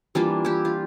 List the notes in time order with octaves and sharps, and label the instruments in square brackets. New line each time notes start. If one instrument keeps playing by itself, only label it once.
[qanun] E3 G3 A#3 D4 F4
E4 G4
F4